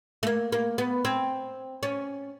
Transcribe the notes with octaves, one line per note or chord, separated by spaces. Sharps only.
A3
A#3
A#3
B3
C4
C#4